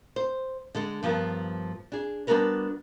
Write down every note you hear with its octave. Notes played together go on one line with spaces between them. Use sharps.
C5
D3 G#3 A4
G2 F3 B3 A#4
D4 G#4
G3 B3 D4 F#4 A#4 B4